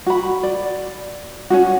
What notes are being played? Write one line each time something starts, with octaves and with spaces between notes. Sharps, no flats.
F#4 B5
D5
C#4 D#4 F#4